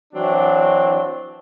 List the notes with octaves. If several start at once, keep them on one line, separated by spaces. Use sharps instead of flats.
E3 F#3 C4 D4